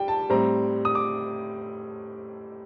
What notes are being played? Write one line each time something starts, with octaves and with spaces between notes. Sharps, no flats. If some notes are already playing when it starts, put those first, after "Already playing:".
Already playing: G3 G5
A5
A2 G3 C4 A#5
D#6
D6